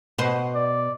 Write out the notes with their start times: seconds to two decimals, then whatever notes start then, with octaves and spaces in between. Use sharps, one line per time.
0.18 B2 B4 C5
0.54 D5